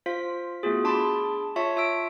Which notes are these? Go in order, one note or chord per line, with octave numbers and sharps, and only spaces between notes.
F4 C5 F5 B6
A3 B3 F4 F#4 G#4
D4 G#4 A5 B5 C6 D6
F4 C#5 E5 A5 C#6
F4 E5 C#6 E6 D7